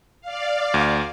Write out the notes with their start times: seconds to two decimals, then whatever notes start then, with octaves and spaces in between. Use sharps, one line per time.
0.21 D5 F5
0.74 D2